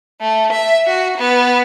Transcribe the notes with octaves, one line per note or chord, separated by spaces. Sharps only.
A3
E5
F#4
B3